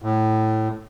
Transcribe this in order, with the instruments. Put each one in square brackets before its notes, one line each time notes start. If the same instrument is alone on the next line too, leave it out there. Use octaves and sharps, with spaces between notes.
[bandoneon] A2